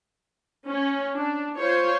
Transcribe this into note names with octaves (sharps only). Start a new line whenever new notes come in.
C#4
D4
F4 C5 C#5